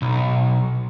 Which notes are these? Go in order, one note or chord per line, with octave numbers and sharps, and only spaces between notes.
B1